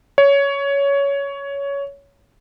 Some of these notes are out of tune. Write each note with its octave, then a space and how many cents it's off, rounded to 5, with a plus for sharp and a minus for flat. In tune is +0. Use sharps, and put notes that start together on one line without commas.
C#5 +15